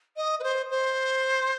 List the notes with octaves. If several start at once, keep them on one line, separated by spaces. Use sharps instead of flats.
D#5
B4
C5
C5